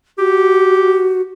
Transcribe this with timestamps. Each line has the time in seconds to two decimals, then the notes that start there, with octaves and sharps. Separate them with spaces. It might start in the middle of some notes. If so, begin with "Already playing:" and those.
0.19 F#4 G4